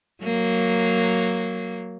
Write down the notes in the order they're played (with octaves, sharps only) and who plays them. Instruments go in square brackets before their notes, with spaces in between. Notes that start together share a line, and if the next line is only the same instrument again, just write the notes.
[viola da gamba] F#3 A#3